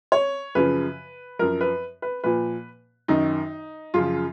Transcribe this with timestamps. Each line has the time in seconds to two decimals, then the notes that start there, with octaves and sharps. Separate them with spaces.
0.12 C#5
0.55 F#2 C#3 F3 B4
1.39 F#2 F3 A#4
1.61 B4
2.02 B4
2.24 A#2 F3 B4
3.08 F#2 D#3 D#4
3.94 F#2 C#3 F3 F4